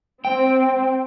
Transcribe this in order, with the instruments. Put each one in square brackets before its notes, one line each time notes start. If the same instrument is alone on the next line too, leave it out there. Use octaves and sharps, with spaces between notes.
[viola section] C4 [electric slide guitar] G5